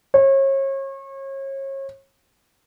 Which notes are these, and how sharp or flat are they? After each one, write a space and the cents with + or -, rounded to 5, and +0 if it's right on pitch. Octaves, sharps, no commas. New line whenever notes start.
C#5 -35